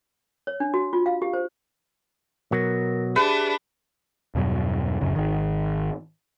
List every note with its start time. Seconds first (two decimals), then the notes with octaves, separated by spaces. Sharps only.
0.47 C#5
0.60 D4
0.74 F#4
0.93 F4
1.06 F5
1.22 G4
1.33 C5
2.52 B2 F#3 A#4 A#6
3.16 D4 G4 G#4 B4 E5
4.35 E2 G2 B2 F#3
5.01 D1 G#1 F#2 C#3
5.16 G#1 D#3